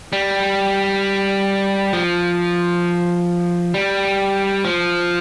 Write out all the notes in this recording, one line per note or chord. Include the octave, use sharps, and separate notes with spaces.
G3
F3
G3
F3